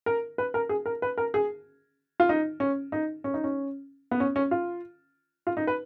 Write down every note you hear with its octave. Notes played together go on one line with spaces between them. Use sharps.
A#4
B4
A#4
G#4
A#4
B4
A#4
G#4
F4
D#4
C#4
D#4
C#4
D#4
C#4
B3
C#4
C#4
F4
F4
D#4
B4